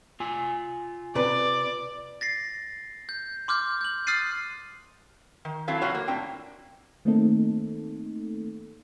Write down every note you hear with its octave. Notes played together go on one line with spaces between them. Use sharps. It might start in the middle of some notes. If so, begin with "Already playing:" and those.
F4 G#5
C3 B4 D5
A6 A#6 C7
G6
C6 D6 F6 G6
G6 F#7
D#6 F6 F#6 A6 C7 D#7
D#3
F#3 C4 E4 A4 F5
F2 C3 F4 F#4 C#5
A#3
A2 C4 D4 G5
D#3 A3 A#3 C4 D#4 A4